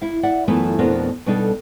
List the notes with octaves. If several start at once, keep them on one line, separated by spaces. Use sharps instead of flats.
E4 F5
D5 E5 F#5
F#2 E3 A3 B3 F4 B4
F2 B2 B3 D4 A#4
B2 G3 D4 D#4 G4 A4